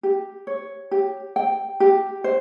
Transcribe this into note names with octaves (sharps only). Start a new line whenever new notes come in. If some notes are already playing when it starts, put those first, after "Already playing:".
G4
C#5
G4
G5
G4
C5